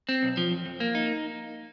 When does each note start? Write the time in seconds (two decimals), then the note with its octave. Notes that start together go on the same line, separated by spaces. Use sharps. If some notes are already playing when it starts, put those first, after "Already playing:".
0.09 C4
0.23 B1
0.37 F3
0.51 F2
0.66 F2
0.80 A#3
0.95 D#4